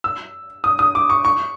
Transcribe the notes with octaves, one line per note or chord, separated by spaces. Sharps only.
E6
D#6
D#6
D6
C#6
C#6